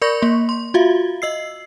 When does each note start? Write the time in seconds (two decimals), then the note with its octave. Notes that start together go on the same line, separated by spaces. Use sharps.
0.02 A#4 D5 B5 C#6 G6 A#6
0.22 A#3 C6
0.49 C6
0.74 F4 F#4 E5 F5
1.22 D#5 E6 C7